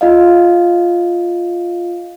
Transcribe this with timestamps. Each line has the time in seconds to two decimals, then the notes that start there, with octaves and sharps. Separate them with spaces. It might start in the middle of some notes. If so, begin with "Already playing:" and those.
0.01 F4 D#5 F5